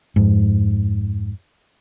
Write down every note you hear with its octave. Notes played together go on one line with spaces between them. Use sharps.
F2 G#2